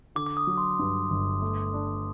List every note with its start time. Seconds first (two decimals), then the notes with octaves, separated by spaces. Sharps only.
0.15 D3 D6
0.26 D6
0.37 D#6
0.47 F#3
0.58 C6
0.79 G2
1.10 G1
1.42 A3
1.74 D4